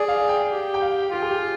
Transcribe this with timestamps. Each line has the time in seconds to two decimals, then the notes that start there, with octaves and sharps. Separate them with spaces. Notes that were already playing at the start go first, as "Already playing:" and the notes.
Already playing: G#4 D5
0.08 F5
0.29 G5
0.51 G4
0.74 G5
0.82 F5
1.13 F4 G4
1.22 G#4
1.31 G4